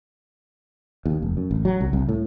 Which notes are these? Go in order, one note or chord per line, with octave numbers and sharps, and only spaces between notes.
D#2
F1
F#2
A1
F#3
C2
C2
A2